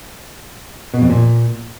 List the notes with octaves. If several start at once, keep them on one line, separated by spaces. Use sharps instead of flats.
B2
F2
A#2